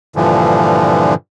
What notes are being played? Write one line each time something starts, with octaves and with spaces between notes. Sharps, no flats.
G2 A#2 D3 E3 F3